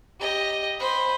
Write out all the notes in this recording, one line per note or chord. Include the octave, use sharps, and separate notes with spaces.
G4 D#5
C5 B5